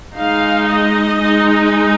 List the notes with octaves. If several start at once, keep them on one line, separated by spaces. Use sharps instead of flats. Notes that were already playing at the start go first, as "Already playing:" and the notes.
G#3 D#4 F5
D#5
G#3 D#4